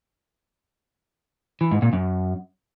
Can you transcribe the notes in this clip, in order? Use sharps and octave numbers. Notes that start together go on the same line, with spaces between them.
E3
G#2
A#2
F#2